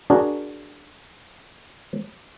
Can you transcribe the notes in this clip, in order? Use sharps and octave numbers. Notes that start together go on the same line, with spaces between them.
D4 F#4 G#4 A#4